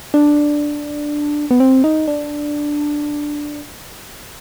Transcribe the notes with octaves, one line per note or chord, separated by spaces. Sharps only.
D4
B3
C4
D#4
D4